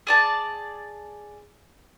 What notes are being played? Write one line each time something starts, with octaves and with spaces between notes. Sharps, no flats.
G#4 D5 A5